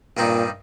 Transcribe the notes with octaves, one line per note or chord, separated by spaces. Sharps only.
G2 A#2 D#3 G3 C4 D#4